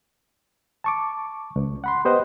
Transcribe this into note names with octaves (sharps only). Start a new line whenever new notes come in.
A5 C#6 D6
C#2
F#5 B5 C6
B3 G4 B4 C5 D#5 F#5